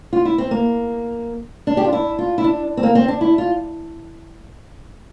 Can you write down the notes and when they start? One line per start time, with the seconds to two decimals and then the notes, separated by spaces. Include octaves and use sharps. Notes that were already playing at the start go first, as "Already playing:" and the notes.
0.13 F4
0.25 E4
0.38 C4
0.51 A#3
1.67 D4
1.77 G4
1.84 F4
1.93 E4
2.19 F4
2.38 E4
2.44 D4
2.77 C4
2.83 A#3
2.95 C4
3.08 D4
3.21 E4
3.38 F4